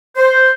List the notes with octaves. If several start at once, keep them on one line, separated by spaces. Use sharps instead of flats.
C5